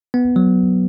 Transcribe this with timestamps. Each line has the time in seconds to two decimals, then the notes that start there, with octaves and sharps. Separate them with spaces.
0.14 B3
0.36 F#3